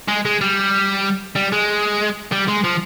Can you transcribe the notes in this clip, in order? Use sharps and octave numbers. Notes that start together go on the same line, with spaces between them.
G#3
G#3
G3
G3
G#3
G3
G#3
F3